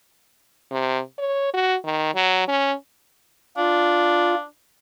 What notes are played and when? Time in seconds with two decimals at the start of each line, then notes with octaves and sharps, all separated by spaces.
0.71 C3
1.18 C#5
1.53 F#4
1.84 D#3
2.15 F#3
2.48 C#4
3.57 D4 F4